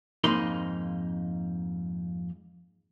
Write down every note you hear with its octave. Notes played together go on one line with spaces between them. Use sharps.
F2 G#2 A#3 D#4 B5 C6